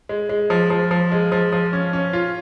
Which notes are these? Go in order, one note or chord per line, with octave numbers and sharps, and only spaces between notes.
G#3
G#3
F3
F3
F3
G#3
F3
F3
C#4
C#4
F4